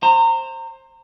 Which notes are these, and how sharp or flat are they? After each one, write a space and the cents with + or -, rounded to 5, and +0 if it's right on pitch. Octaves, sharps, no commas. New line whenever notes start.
C5 +15 A#5 -25